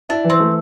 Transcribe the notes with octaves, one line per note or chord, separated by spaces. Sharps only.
D4 E4
E3
C4
A3